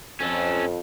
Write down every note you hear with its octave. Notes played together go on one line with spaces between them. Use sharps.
F2 C#4 A4